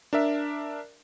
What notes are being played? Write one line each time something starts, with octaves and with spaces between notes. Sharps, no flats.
D4 A#4 E5